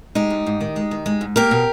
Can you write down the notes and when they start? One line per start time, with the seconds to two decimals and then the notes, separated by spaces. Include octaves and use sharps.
0.15 G#3 D#4 G4
0.30 G#2
0.46 G#2
0.61 D#3
0.76 G#3
0.91 D#3
1.06 G#3
1.21 G#2
1.36 A#3 G4 A#4
1.51 B2